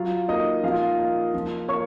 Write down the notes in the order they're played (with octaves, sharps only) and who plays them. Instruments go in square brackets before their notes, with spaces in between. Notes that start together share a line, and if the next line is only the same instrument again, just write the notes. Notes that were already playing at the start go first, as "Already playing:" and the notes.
Already playing: [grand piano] F#3 [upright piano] F4 F5
[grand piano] A#3 [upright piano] D#4 D#5
[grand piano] F3 [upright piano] F4 F5
[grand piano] A#3
F3
[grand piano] A#3 [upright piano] C#5 C#6